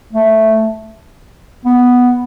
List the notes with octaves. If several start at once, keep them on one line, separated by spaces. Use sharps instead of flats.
A3
B3